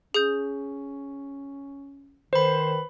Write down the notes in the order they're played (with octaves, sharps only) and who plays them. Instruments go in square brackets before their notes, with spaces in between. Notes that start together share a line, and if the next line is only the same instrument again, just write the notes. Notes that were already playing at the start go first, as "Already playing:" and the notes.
[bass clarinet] C#4 [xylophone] G#4 D#6 G6
[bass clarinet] D#3 [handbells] B4 B5 [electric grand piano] C5